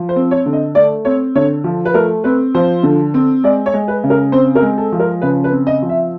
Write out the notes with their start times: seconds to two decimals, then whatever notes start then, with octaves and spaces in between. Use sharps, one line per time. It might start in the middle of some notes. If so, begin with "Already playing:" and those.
Already playing: F3
0.09 C5
0.16 C4
0.31 C#5
0.46 D3
0.53 D#5
0.75 A3 D5
1.05 C4 C#5
1.35 D3 C#5
1.64 F3
1.85 B4
1.94 A3 A#4
2.24 C4 B4
2.55 F3 C5
2.83 D3
3.14 C4
3.44 G#3 D5
3.66 C#5
3.74 G#3
3.88 B4
4.04 C#3
4.10 A#4
4.32 C4 C5
4.55 A#4
4.62 G#3
4.78 A4
4.92 F3
5.00 A#4
5.22 C#3 B4
5.44 B4
5.52 C4
5.67 D#5
5.82 F3
5.89 E5